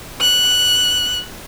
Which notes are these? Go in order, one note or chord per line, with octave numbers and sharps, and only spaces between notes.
F#6